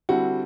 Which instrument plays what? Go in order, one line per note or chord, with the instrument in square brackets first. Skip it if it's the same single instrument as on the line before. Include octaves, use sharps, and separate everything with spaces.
[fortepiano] D3 G3 C4 E4 [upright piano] F#4